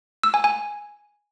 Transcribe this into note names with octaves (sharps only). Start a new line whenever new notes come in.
E6
G#5
G#5